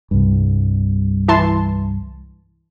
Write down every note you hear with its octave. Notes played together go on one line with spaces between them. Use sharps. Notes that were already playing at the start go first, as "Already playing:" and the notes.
C2 G2
E3 A5 C6